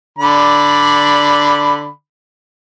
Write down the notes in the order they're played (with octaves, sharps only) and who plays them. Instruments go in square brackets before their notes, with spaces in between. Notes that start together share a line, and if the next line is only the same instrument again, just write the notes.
[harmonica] D3 D5 B5